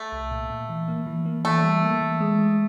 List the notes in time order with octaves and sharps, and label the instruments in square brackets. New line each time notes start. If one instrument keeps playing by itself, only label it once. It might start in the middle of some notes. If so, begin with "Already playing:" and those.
Already playing: [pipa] A3
[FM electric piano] C2
A#2
A#2
E3
A#3
E3
A#3
[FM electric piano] E3 [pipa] A3
[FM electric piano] G3
A#3
E3
G#3
G#3